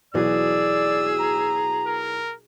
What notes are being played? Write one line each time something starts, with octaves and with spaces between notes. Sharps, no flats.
B1 E3 F#3 G#4 D5 E6
A#5
A#4